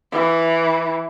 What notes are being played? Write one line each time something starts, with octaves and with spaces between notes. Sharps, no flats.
E3